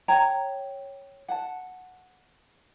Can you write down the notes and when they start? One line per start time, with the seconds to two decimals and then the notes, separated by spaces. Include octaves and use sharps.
0.08 C#5 G5 A#5
1.28 F#5 A5